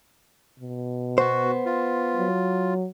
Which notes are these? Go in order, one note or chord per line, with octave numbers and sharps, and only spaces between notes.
B2
B3 F#4 C5
F4
F#3